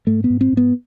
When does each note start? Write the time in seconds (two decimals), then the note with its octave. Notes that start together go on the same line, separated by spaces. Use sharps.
0.07 G#2 A3
0.24 B3
0.30 G#2
0.41 C4
0.52 G#2 B3